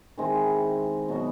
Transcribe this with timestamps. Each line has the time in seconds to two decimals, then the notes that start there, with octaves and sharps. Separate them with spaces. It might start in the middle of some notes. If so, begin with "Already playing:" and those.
0.17 D#3 G#3 C4 E4
1.08 B2 F#3 B3